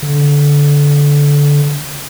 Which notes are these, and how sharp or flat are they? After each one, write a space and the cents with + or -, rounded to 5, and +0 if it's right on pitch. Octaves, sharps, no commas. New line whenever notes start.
D3 -20